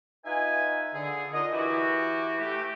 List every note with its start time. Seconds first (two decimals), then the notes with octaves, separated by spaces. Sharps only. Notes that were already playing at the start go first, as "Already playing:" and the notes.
0.25 D#4 F4 B4 E5 G#5
0.94 D3 G#4
1.33 D4 D#4 F4 A#4 D#5
1.52 E3 E4 F#4 G4
2.40 A3 G4